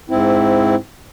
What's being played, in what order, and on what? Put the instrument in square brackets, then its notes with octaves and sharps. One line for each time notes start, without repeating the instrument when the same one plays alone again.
[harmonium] G#2 C4 E4